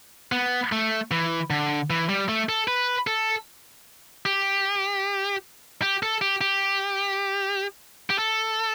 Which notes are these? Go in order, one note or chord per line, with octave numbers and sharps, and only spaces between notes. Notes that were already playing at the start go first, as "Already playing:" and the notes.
B3
A3
E3
D3
E3
G3
A3
A4
B4
A4
G4
G4
A4
G4
G4
G4
A4